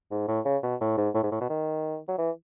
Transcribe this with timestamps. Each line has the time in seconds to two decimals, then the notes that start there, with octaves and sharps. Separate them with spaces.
0.11 G#2
0.28 A2
0.45 C#3
0.63 B2
0.81 A2
0.97 G#2
1.14 A2
1.23 G#2
1.32 A2
1.41 B2
1.50 D#3
2.08 F#3
2.18 E3